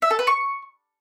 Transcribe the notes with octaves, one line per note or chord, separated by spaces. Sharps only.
E5
A4
B4
C#6